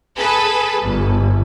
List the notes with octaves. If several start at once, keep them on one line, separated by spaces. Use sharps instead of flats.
G#4 A4 B4
G1